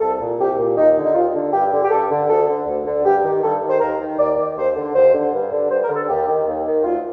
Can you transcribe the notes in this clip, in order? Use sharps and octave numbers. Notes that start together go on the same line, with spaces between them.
C2 A4
A#2
C2 G4
A#2
D#2 D#4
D3
D#4
D#2 F4
D3
G2 G4
D3
G4
G2 A4
D3
D2 A4
D3
D2
D3
G2 G4
D#3
G2 A4
D#3
C5
D#2 A#4
D#3
D#2 D5
D#3
D#2 C5
D3
D#2 C5
D3
G2
D3
G2 C5
A#4
D3
A4
D#2 G4
D#3
D#2
D#3
D2 F4